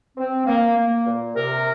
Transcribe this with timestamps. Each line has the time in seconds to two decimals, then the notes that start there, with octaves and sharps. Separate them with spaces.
0.17 C4
0.46 A#3
0.76 A#3
1.06 A#2
1.35 C3 A#4